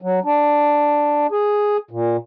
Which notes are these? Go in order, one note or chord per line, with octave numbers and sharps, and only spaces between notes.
F#3
D4
G#4
A#2